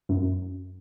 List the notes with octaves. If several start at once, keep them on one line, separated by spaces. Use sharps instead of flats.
F#2